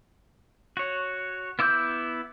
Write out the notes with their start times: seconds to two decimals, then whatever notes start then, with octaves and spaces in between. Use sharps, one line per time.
0.77 F#4 C#5
1.59 B3 E4 D6 E6 G6